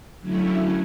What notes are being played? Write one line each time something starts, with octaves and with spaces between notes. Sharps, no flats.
D3 F#3 A3 C#4 E4